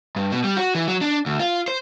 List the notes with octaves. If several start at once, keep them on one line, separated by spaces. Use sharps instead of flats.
G2
B2
G3
F#4
E3
F#3
D4
D2
F4
C5